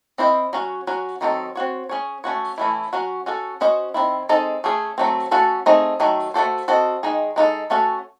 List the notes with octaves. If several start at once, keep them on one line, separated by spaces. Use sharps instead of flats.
C4 E4 C5 D#5
F#3 C#4 F#4
F#3 C#4 F#4
D#3 F#3 C4 D#4 A4
C4 F#4 C#5
C#4 G#4 C#5
A3 C#4 F#4 C#5
E3 A3 C#4 E4
F#3 C#4 F#4
C#4 F#4 A4
C#4 F#4 C5 D#5
D#3 F#3 C4 E4
G#3 C4 D#4 A4 D#5
A3 C#4 G#4
F#3 A3 C4
A3 C#4 F#4 A4
A3 C4 D#4 G#4 D#5
D#3 F#3 A3
A3 C4 F#4 A4 C5
C4 F#4 A4 D#5
D#3 G#3 D#4 G#4
G#3 D#4 F#4 A4
A3 C#4 F#4 A4